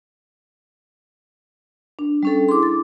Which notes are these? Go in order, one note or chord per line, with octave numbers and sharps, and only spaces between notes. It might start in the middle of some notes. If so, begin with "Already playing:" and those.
D4
G3 C#4 A4
E4 G#4 C6 D6
A6